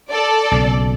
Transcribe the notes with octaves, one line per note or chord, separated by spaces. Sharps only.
A4 D5
B1 C#3